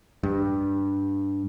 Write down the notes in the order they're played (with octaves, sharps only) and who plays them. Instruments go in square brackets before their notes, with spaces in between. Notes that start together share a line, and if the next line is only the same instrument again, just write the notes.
[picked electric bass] G2